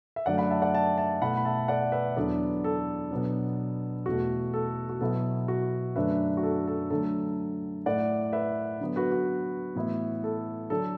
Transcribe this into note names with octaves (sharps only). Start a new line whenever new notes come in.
E5
F#2 D3 F#3 A3 D5 F#5
F#5 B5
E5 A5
D5 F#5
E5 A5
E5 A5
B2 A3 E4 F#5 B5
B5
E5 A5
D5 F#5
B4 E5
E2 D3 F#3 B3 D4 A4 D5
A4
B2 F#3 B3 D4
E2 B2 A3 F#4
A4
F#4
B2 F#3 B3 E4 A4
F#4
F#2 D3 F#3 A3 D4 B4 E5
F#4
A4
A4
D3 F#3 A3 A4
A2 A3 E4 D5 F#5
B4 E5
D3 F#3 B3
F#4 B4
F#4
A2 E3 B3 E4
A4
D3 F#3 D4 A4